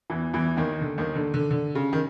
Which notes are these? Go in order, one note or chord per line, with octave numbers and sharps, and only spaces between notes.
E2 E3
E2 E3
D#2 D#3
D3
D#2 D#3
D3
D3
D3
C#3
D#3